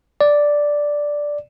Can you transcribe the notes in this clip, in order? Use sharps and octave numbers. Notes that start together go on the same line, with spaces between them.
D5